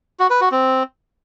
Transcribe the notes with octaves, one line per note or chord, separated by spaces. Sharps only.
F#4
B4
F#4
C4